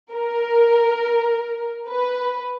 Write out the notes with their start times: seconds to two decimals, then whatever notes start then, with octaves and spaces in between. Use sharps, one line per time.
0.12 A#4
1.89 B4